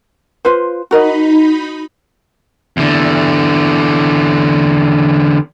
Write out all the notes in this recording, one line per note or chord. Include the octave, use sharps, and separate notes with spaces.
F4 B4 C5
D#4 F#4 A#4 D#5 B5
E2 D3